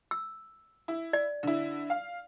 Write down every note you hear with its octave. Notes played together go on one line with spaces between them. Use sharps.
E6
E4
D5
D3 E4
F5